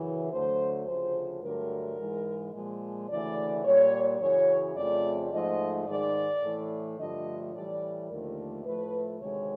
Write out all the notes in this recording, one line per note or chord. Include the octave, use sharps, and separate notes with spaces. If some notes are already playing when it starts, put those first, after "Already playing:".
Already playing: F#2 C#3 E3
D2 D3 F#3 A3 C5
D2 C#3 F3 C5
G2 D3 F#3 A3 A#4
G#2 E3 G#3
A#2 F3 G#3
D2 C#3 E3 A3 D5
A#2 G3 C#5
F#2 C#3 E3 C#5
F2 C#3 F3 A3 D5
G#2 F3 A3 D#5
G#2 D#3 G#3 D5
A2 E3 A3
G2 D3 F3 A3 D#5
A2 E3 G3 D5
D#2 D3 F3 A3 A#4
A2 F3 A3 B4
D2 C3 D#3 G#3 C#5